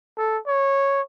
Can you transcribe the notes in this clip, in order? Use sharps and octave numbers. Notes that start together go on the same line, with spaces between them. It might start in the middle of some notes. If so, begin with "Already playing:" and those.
A4
C#5